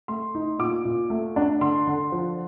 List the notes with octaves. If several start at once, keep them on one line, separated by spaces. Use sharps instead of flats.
A3 C6
D#4
A#2 D6
A#2
A3
D4
D3 C6
D3
F3